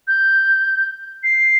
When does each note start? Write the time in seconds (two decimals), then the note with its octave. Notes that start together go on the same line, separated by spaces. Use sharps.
0.08 G6
1.24 C7